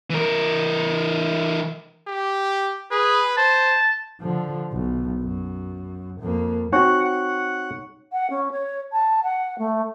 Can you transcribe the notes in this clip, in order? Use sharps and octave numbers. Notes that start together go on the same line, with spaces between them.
E3 A#4
G4
G#4 B4
C5 A5
D3 F3
B1
F#2
F2 A#3
C4 D#4 F#4 C#5 F#5 C#6
F#5
F#5
C#4
C#5
A5
F#5
A3